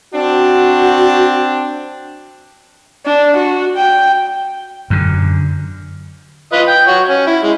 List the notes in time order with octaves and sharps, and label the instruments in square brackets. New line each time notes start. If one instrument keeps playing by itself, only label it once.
[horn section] C4 D4 [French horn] F#4
[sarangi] D4
F#4
G5
[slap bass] F#2 D3
[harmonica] F4 B4 D#5
G5
F#4 C#5
C#4
E4
G#3